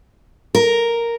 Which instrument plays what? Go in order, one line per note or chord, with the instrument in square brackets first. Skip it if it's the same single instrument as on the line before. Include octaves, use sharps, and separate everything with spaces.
[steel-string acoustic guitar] A#4